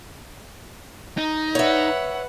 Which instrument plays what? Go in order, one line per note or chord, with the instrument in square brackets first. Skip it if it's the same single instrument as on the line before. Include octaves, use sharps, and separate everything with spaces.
[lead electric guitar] D#4 [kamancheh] D#5
[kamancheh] B4 F#5 [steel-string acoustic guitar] C#5 E5